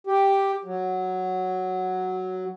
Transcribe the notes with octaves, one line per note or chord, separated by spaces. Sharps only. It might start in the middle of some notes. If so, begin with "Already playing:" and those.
G4
F#3